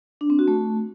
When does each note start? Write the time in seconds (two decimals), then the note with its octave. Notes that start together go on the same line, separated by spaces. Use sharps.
0.21 D4
0.30 C4
0.39 F#4
0.48 A3